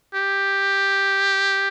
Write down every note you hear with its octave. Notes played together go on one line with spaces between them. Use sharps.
G4